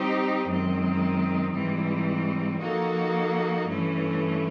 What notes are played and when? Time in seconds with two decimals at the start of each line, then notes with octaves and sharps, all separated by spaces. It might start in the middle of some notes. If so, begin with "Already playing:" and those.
Already playing: G3 C4 D#4 G4 C5
0.47 F#2 D#3 G#3 C4
1.54 G#2 E3 G3 C4
2.62 F3 A#3 D#4 F#4 A4
3.68 G2 E3 A3 C#4